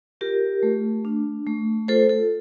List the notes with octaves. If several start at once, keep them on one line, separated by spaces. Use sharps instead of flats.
F4 G4 A#4
A3
D4
A3
F4 A4 C5
A4